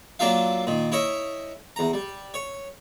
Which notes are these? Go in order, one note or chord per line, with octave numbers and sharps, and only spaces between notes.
F#3 A#3 D4 F4 E5 F5
A#2 D#3
E4 C#5 D#5 E5
E2 A#5
G3
C#5